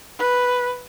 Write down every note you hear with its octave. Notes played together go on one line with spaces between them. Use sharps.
B4